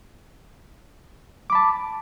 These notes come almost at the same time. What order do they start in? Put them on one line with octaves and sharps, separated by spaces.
D6 B5 A5